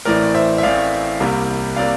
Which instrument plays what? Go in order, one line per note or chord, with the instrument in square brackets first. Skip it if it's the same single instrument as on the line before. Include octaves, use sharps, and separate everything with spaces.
[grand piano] A1 A2 E3 A3 C4 A#4 D5
D5
C5 E5
E5
A1 A2 E3 A3 C4 D5 F5
C2 C3 G3 A#3
C3 G3 A#3 D5 F5